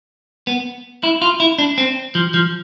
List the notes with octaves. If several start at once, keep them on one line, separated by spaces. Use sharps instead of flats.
B3
E4
F4
E4
D4
C4
F3
F3